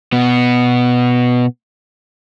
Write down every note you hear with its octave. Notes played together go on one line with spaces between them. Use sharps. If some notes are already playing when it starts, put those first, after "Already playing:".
B2 B3